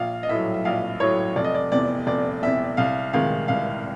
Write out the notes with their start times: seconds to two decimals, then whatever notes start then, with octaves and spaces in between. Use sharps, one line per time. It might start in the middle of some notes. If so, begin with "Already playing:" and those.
Already playing: A#1 F5
0.23 D#5
0.29 A2 F#3 E5
0.54 E5
0.65 A#1 F5
1.00 A2 F#3 C#5
1.36 F1 D5
1.44 D#5
1.54 D5
1.72 E2 C3 D5
2.07 F1 D5
2.42 E2 C3 E5
2.77 C2 F5
3.13 C3 D#3 G#3 F5
3.48 C2 F5